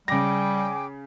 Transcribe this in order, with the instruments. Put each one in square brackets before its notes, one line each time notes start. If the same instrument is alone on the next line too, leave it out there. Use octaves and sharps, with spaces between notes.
[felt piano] C#3 A#6 [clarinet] G3 [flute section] G#4 G5 D6